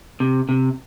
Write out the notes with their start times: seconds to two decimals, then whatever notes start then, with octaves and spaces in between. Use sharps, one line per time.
0.20 C3
0.49 C3